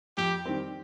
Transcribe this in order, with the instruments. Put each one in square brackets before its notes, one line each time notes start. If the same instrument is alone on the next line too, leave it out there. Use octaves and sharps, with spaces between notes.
[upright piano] F2 [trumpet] G4
[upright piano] D#3 G3 C4